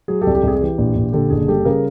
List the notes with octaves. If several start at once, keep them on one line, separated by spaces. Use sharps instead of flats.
F#3 G#4
G4 A4
C2
G4 A4
C2 G#4
G#4
E3 G4
A#1
A#1
D3 G4 A4
F#1 G#4
G3 G4 A4
C#3 G#4 A#4